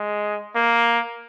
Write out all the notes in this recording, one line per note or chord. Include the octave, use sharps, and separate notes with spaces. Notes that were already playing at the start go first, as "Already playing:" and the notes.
Already playing: G#3
A#3